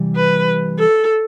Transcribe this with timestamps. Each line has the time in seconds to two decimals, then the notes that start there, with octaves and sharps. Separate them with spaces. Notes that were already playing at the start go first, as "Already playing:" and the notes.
Already playing: C3 E3 G3
0.16 B4
0.79 A4